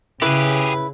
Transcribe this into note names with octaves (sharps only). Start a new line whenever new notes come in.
C#3 E4 G4 G#4 B4